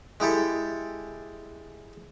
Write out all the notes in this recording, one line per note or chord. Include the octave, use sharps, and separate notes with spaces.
G#3 E4 G4 A4